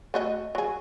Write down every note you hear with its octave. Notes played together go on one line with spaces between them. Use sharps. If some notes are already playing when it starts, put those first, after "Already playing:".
A3 F#4 D#5
F#3 G#4